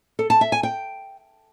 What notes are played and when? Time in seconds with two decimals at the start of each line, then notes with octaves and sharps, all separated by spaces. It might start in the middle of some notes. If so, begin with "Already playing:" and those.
0.19 A4
0.30 A5
0.41 E5
0.52 G#5
0.63 G5